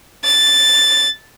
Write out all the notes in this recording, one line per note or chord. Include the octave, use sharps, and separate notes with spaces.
A6